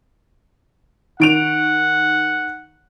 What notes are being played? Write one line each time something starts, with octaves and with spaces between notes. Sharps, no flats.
D#3 F#5 D7 F7